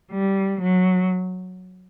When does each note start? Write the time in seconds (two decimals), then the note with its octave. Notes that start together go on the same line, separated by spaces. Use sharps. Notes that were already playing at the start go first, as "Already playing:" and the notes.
0.11 G3
0.61 F#3